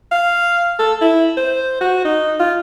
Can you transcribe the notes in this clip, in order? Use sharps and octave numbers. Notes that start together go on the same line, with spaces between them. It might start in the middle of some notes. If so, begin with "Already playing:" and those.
F5
A4
E4
C5
F#4
D#4
F4